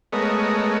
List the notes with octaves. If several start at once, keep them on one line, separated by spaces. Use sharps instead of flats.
G#3 A3 B3 A#4 C#5 D#5